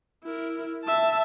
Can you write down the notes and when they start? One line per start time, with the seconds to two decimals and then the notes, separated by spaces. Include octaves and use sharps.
0.24 E4 A#4
0.85 E5 A5